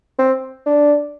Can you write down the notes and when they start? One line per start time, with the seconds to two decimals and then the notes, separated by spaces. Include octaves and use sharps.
0.19 C4
0.66 D4